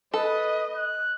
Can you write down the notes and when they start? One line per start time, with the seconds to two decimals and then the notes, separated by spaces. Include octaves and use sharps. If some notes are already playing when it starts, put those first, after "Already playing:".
0.14 A4 B4 D#5
0.76 F#6